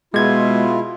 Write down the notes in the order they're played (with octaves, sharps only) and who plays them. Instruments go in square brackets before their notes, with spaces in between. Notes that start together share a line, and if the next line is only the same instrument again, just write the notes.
[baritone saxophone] B2 [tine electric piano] G#3 G#6 [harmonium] E4 F4